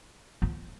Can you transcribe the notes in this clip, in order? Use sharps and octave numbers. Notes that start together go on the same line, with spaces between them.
F3